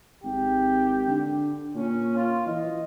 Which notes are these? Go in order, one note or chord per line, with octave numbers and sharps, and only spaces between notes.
G#1 G4
D3
A#2 C#4
F4
E3 D#5